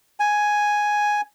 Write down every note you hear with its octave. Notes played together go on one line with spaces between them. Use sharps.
G#5